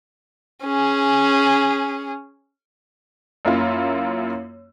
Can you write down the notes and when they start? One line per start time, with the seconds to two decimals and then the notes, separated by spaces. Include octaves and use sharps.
0.64 C#4 G#4
3.45 F#2 A#3 E4 F4